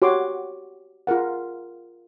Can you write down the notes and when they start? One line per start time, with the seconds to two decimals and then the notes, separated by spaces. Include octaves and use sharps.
0.02 F#4 G4 C#5 F#5 C6 D6
1.07 F4 G#4 A#4 F#5